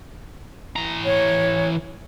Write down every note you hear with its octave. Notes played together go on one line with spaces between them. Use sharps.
E3 A#5
C#5